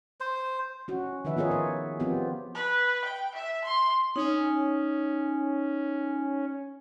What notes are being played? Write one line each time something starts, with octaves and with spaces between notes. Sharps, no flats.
C5
C#4 F#4
D#3 F3 D#4 B4 E5
B3 F4 G#4 A#4 C#5
C#5
F3 B3 C4 F4 G4
B4
G5
E5
C6
C#4 D#4